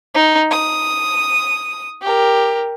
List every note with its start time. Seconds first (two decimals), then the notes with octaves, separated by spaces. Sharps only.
0.15 D#4
0.51 D#6
2.02 G4 A#4